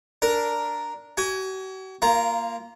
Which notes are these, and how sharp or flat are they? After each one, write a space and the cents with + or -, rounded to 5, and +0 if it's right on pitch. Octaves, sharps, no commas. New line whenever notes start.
D4 -5 A#4 +0
F#4 +45 G#5 +0
A#3 +0 F4 -25 A#5 +0